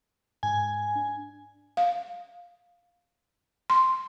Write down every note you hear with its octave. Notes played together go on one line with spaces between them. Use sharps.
G#2 G#5
D4
F5
C6